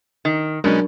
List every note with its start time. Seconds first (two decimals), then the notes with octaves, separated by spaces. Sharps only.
0.25 D#3
0.64 B2 F#3 G#3 C#4 D4 A#4